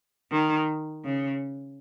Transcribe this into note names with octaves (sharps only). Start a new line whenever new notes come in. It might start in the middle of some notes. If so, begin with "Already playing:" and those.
D#3
C#3